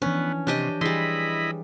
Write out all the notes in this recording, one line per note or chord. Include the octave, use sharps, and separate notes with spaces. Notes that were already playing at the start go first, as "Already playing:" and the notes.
E3 F3 B3 C#4 D4
C3 D4 G4 C#5 D#5
E3 G3 E4 G#4 D#5 B5 C6